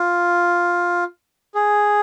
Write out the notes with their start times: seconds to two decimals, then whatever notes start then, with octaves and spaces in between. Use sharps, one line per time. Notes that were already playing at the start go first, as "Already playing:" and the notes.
Already playing: F4
1.55 G#4